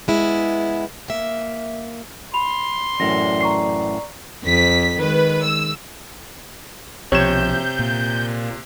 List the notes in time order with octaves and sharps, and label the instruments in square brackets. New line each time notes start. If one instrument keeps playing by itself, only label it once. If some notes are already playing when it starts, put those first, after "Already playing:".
[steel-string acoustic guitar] G#3 B3 E4
A#3 E5
[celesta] B5 F7 [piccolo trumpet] C6
[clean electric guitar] F#2 A2 E3 [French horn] D5 [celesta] A#6
[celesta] A#5 C#6 C7
[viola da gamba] F2 [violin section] B6
[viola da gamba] D#3 G#3 [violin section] B4
[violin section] E6
[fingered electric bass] B1 F3 [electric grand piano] C3 E7 [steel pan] C#5 [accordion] G6
[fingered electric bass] A#2